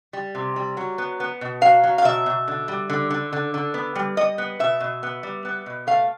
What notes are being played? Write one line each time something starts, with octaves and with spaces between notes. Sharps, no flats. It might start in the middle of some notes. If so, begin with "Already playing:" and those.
G3
C3
G3
F#3
B3
B3
B2
F#3 F5
F#3
F5
B2 E5
B2
D3
G3
D3
D3
D3
D3
B3
G3
G3 D#5
B3
B2 E5
B2
B3
G3
B3
B2
A3 F5